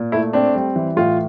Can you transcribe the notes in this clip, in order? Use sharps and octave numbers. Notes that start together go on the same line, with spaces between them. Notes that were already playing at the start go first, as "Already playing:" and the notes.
Already playing: A#2
A3 E4
C4 D4
G3
E3
A2 F4